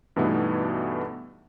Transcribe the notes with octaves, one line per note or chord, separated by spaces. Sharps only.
G2 B2 E3 A3 B3 D#4